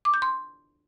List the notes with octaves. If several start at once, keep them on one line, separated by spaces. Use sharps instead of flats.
D6
G6
C6